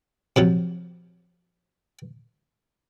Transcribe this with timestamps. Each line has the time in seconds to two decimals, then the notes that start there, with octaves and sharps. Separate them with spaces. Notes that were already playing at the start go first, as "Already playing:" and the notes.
0.36 C3 F3 F#3